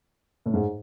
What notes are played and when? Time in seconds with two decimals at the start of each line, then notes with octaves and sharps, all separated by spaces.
0.46 A2
0.54 G#2